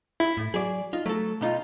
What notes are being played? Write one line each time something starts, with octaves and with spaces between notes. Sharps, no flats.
E4
A2
F#3 G#4 D5
D#4 F4
F#3 A3 A4
B2 D#4 F4